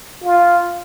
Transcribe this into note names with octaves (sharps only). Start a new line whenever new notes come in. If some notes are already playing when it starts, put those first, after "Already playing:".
F4